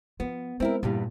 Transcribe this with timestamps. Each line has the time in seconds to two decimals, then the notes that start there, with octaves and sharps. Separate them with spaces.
0.20 F3 B3
0.60 G#3 C4 E4 A#4
0.83 E2 G2 A#2 G3